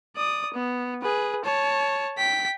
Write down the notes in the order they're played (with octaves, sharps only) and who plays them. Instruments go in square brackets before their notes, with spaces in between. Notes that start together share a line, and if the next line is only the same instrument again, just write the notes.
[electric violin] D5 D#6
B3
G#4 B4
C#5 A5
G5 B6